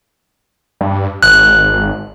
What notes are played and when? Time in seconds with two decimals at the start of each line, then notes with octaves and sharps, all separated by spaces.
0.81 G2
1.23 G#1 F#6